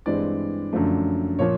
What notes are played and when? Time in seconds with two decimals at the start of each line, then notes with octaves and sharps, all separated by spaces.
0.06 G2 E3 G#3 C4 D5
0.73 F#2 D3 F3 A3
1.39 A#2 F3 C#5